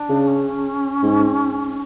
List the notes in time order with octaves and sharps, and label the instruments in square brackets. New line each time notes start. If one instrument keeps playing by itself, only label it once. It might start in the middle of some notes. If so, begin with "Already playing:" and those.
Already playing: [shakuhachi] D4
[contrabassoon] C#3
[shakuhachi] C#4
[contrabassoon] G#2